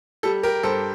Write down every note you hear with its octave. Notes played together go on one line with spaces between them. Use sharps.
G3 A4
G4 A#4
G2 A4 C5